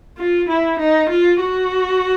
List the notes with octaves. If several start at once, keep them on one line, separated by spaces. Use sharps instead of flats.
F4
E4
D#4
F4
F#4